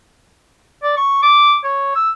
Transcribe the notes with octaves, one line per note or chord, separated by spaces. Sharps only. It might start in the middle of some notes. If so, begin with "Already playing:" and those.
D5
C#6
D6
C#5
E6